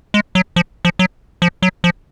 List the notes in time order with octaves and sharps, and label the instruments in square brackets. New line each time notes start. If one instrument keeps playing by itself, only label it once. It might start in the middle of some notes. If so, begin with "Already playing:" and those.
[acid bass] G#3
F#3
F3
F3
F#3
F3
F#3
F3